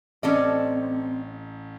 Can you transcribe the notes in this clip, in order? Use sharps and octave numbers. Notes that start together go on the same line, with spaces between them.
A1 C4 C#4 A4 D5 D#5